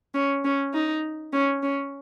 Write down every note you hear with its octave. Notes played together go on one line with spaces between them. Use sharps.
C#4
C#4
D#4
C#4
C#4